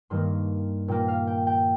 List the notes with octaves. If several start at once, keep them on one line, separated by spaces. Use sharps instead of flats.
G2 D#3 A#3 C6
A#2 A#3 G5
F5
G5
G5